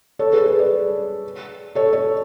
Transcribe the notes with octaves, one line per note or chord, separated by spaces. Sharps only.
A4 C#5
G#4 B4
G#4 B4
B4 D5
A4 C#5
A4 C#5